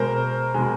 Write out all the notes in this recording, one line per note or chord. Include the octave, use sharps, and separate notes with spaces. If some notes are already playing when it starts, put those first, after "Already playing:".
Already playing: B2 G#3 A#4 C5
B2 G#3